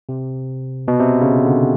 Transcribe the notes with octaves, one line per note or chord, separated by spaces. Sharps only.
C3
B2
C3
C#3
D3